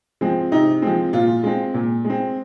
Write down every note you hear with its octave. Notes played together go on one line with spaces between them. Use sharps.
F3 G#3 C4
C3 D#4
F3 G#3 C4
A#2 F4
G#3 C4
A#2
G#3
C4